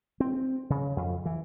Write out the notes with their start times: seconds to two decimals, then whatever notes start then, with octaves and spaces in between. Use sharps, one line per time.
0.20 C4
0.70 C#3
0.97 F2
1.26 E3